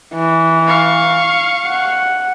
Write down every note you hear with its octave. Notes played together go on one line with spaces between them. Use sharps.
E3
F5 C#6
F#5